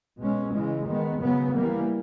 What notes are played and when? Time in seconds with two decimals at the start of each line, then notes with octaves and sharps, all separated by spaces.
0.19 B2 G#3 C#4
0.53 C#3 E3 G#3
0.87 D#3 G#3 B3
1.20 C#3 F#3 B3
1.54 E3 G3 A#3